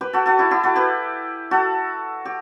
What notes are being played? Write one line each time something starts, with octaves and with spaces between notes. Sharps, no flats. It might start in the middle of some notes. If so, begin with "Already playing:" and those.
G4 B4
F#4 A4
F#4 A4
E4 G4
E4 G4
F#4 A4
G4 B4
F#4 A4
G4